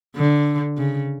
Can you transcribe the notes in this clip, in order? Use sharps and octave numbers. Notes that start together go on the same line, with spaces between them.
D3
C#3